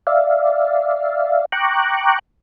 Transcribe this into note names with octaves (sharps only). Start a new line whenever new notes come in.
D5 E5 F5
G5 A#5 C#6 D6 F#6